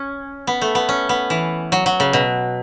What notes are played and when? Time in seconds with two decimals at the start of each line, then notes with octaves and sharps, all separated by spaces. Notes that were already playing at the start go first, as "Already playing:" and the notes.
Already playing: C#4
0.47 B3
0.62 A3
0.75 B3
0.89 C#4
1.09 B3
1.30 E3
1.72 F#3
1.86 F#3
2.00 C#3
2.13 B2